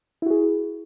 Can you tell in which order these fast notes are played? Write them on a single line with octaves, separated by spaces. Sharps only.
E4 F#4 G#4